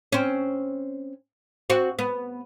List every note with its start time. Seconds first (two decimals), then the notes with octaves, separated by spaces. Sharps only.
0.12 C4 C#4
1.70 C4 F#4
1.99 B3